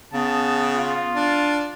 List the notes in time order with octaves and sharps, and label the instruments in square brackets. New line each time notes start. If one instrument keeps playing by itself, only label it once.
[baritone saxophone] C#3 [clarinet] B3 [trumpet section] A5
[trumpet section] F4
[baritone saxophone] D4